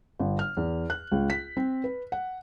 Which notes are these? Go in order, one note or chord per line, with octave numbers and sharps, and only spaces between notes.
G1
F6
E2
F#6
C#2
B6
C4
B4
F#5